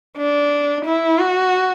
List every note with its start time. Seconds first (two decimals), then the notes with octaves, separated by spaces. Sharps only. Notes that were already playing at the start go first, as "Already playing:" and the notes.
0.17 D4
0.85 E4
1.19 F#4